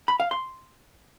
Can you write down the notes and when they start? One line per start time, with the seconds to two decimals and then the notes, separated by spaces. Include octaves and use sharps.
0.08 B5
0.20 F5
0.31 C6